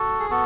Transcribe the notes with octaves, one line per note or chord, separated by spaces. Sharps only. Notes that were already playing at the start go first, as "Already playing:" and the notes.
Already playing: F#4 A4
G#4
B3 F#4 A4